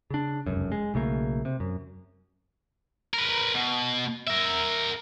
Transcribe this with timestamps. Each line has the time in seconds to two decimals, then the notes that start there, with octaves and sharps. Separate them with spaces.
0.10 C#3 D4
0.46 F1 C#2 F#2
0.72 G#3
0.94 B1 C#3 A3 A#3
1.45 C3
1.60 F#2
3.14 A#4 B4
3.55 B2
4.27 A#4 E5